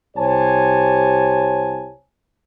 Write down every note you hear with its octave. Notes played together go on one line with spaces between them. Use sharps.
C2 G4 C5 C#5 G#5 A5